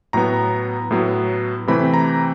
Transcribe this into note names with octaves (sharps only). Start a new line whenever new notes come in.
A2 F#3 B3 A#5
A2 F#3 B3
C3 E3 A3 C4 B5
A#5